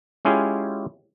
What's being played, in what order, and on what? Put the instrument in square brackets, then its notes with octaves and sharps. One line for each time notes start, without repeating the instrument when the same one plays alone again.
[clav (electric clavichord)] G#3 C#4 E4 F4 G4 G#4